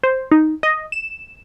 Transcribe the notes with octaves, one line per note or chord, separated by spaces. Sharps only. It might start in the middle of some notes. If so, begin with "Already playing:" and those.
C5
D#4
D#5
E7